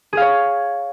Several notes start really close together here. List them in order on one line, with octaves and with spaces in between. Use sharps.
G#4 F5 C#5